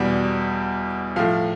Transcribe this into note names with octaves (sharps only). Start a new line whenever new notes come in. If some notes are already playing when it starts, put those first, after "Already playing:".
Already playing: E2 B2 G3
A2 F3 F5